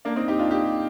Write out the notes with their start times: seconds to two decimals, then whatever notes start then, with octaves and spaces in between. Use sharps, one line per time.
0.05 A#3 D4
0.16 C4 D#4
0.28 D#4 G4
0.39 D4 F4
0.51 D#4 G4